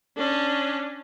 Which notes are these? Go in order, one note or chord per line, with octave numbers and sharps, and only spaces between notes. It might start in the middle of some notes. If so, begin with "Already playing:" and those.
C#4 D4